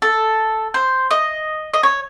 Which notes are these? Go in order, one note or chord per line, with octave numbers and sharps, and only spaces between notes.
A4
C5
D#5
D#5
C#5